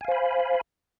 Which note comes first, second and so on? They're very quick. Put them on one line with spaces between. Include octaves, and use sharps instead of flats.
G#5 F5 C5 B5